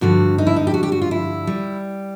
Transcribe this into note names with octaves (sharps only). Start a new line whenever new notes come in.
G2 D3 F3 F#4
D#4
E4
D#4
G4
F#4
G4
F#4
F4
E4
G3